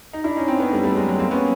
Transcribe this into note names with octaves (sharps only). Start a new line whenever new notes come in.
D#4
D4 E4
C#4 D#4
C4 D4
B3 C#4
G3 A3
G3 A3
F#3 G#3
F#3
A#3 C4
B3 C#4